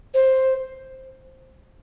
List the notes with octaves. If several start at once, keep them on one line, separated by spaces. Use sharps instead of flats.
C5